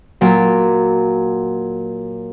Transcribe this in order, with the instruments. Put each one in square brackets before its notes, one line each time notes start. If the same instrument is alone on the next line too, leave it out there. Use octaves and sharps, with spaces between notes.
[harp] A#2 F#3